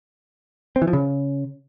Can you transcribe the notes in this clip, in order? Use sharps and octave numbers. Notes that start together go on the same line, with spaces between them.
C4
E3
F3
C#3